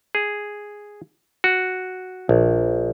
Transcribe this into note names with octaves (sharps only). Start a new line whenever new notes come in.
G#4
F#4
A#1